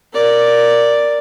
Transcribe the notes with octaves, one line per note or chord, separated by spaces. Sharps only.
A#4 D5